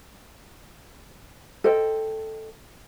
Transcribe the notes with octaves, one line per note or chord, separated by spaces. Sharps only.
A4 C5 D#5 G5